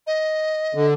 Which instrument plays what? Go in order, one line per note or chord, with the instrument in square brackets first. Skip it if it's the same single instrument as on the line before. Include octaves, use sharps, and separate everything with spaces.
[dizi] D#5
[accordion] D3